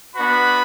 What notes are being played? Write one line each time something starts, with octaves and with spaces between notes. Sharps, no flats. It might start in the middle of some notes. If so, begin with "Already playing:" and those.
B3 D4 F#4 B4 B5